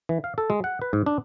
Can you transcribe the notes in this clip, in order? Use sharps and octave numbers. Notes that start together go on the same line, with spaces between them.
E3
F5
A4
G#3
F#5
B4
G#2
D4